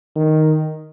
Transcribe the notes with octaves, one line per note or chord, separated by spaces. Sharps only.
D#3